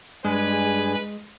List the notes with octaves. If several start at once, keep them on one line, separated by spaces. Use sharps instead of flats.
G2 G#3 D4 G#4 B4 G#5